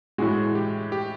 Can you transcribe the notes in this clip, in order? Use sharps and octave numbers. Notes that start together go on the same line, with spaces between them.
A2 E3 G#3 F#4
G4
G4